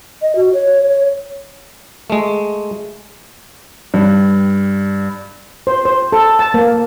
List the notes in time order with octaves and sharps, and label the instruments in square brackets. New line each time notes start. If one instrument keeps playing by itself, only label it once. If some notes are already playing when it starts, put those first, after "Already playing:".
[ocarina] D#5
F#4
C#5
C#5
[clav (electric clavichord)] G#3 A3
[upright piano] G2
[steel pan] C5
C5
A4
A5
A#3